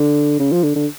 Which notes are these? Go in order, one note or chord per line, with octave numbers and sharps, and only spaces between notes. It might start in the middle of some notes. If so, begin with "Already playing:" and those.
Already playing: D3
C#3
F3
D3
D3